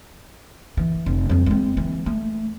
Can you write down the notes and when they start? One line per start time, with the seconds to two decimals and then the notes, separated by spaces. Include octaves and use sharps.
0.77 E3
1.06 F1
1.29 F2 F#3
1.46 G#3 C4
1.77 E3
2.06 A3